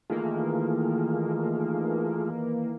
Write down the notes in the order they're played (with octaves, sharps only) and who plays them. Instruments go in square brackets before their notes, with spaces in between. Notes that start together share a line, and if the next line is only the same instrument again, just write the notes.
[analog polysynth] D#3 E3 A#3 [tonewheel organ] A3 F4 G#4